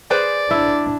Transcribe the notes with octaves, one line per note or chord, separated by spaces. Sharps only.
G#4 B4 C5 D5
D4 E4